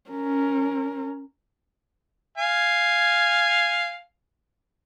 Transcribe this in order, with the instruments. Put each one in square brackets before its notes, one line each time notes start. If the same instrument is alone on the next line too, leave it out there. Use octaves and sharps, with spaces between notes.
[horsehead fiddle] C#4 A#4
[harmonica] F5 G#5